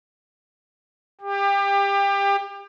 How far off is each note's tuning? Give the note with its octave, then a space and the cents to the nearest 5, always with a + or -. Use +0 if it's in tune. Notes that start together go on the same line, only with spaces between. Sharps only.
G4 +25